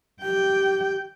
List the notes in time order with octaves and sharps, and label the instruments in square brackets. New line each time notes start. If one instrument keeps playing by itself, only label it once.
[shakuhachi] G4 [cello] G5